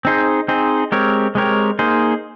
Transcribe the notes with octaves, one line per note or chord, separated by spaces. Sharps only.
C4 D#4 G#4 C5
C4 D#4 G#4 C5
G#3 C4 G4 A#4 C#5
G#3 C4 G4 A#4 C#5
A#3 D#4 G#4 C5